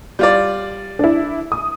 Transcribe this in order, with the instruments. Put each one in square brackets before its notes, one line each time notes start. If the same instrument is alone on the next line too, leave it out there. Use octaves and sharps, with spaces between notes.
[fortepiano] G3 F4 D5
[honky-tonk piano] D4 E4
D#6